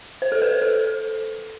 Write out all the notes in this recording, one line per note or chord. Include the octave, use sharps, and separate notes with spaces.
C5
A4
B4
C5
A4